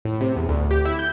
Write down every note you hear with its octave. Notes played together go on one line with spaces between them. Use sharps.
A2
C3
E2
D2
G4
E4
G6